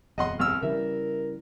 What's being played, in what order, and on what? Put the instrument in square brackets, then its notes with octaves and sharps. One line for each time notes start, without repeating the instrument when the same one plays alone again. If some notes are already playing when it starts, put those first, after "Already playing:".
[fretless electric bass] D#1 F2 [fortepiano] D#5 F#5 C6
[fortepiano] C2 E6 [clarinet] F6
[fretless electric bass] C#3 E3 G3 [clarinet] A#4 [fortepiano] E5